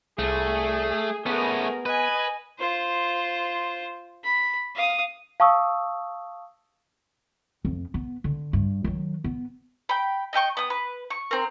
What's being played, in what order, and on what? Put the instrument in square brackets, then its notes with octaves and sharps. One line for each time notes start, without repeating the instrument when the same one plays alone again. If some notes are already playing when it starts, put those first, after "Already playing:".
[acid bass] C2 [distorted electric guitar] A3 [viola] G#4
[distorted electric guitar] A3 C#4 [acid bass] B3 [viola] G#4 A#4
[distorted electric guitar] B4 [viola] D#5 G#5
[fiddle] F4 C5
B5
F5 D#6
[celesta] F5 A5 C#6 D#6 E6
[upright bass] F2
B3
D3
G2
D#3 F#3
B3
[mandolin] G5 B5
D#5 E5 G5 C#6
B3 D#6
B4
C#6
C4 A#4